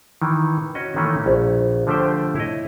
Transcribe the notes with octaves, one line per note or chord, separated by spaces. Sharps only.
D#3 E3
C#4 F#4 D#5
D#3 E3 A3 A#3 C#4
A#1
D3 F3 A3 G4 C5 G5
E4 C#5 D#5